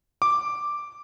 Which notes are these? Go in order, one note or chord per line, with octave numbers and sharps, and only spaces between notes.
D6